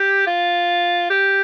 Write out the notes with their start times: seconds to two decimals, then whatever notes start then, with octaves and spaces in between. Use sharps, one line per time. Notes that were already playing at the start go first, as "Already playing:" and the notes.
Already playing: G4
0.26 F4
1.10 G4